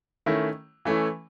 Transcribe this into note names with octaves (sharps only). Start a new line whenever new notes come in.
D#3 A3 C#4 E4
E3 A3 C#4 E4